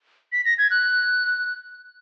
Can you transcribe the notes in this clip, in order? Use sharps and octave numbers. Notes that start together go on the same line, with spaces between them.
B6
A#6
G#6
F#6